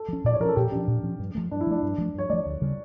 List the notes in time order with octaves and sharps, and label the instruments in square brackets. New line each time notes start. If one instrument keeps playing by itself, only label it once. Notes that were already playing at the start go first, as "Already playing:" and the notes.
Already playing: [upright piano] A4
[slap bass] F3 C#4
[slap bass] A#2 [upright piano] D5
[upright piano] C#5
[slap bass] F3 [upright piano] A#4
[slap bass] C#4 [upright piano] A4
[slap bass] A#2 [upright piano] G4
[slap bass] F3 C#4 [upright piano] D4
[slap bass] A#2
F3 C#4
G2
F3 A3
[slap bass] G2 [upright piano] D4
[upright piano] E4
[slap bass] F3 A3 [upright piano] D4
[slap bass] G2
F3 A3
[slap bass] G2 [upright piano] C#5
[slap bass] F3 A3 [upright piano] D5
[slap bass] D2
C#3 G3